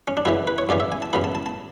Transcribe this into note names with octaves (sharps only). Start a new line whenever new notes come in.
C#4
D4
F#2 C#3 E3 E4
B4
C#5
F#2 C#3 E3 D5
E5
G#5
A5
F#2 C#3 E3 B5
A5
A5
A5